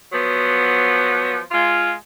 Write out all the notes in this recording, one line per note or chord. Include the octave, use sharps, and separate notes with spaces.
F3 F#3 B3
G#3 F4